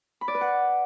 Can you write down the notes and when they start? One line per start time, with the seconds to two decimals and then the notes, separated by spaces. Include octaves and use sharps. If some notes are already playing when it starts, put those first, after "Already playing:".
0.21 B5
0.28 D5
0.34 B4
0.41 F#5